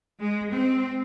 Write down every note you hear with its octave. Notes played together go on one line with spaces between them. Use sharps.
G#3
C4